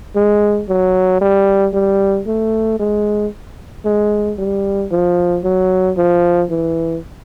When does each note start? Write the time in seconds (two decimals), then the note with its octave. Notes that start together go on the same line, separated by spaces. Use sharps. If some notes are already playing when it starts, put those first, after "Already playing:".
0.16 G#3
0.69 F#3
1.21 G3
1.74 G3
2.27 A3
2.79 G#3
3.85 G#3
4.38 G3
4.91 F3
5.44 F#3
5.97 F3
6.50 E3